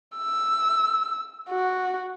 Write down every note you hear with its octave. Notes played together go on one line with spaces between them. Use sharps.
E6
F#4